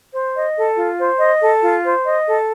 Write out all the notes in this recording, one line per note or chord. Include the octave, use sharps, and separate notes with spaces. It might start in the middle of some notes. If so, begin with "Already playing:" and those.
C5
D#5
A4
F4
C5
D#5
A4
F4
C5
D#5
A4